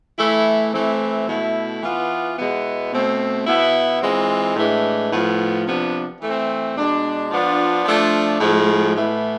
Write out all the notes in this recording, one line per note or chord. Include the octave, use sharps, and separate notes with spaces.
E3 A3 E4
E3 A3 C4 E4
B2 A3 E4
E3 B3 F4
B2 G#3 B3 E4
B2 A3 C4
B2 B3 E4
E3 G#3 C4 F4
A2 E3 G#3 D4
A2 F3 B3 F4
C3 F3 B3 D4
E3 A3 C4
B2 G#3 D4
F3 B3 D4 F4
F3 A3 D4 F4
A2 F3 G#3
A2 E3 B3